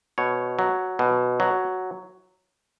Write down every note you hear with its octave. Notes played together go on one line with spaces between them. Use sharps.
B2 C#5
F#3
B2
F#3